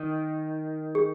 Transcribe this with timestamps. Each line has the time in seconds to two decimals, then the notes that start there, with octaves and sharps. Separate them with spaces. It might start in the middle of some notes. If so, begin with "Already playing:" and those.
Already playing: D#3
0.95 G#4